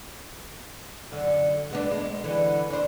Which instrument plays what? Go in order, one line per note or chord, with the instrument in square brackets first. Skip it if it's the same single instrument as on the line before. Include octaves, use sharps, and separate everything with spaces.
[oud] F#2 D3
G#3 B3 D4
G#3
D3 E3
D4 C5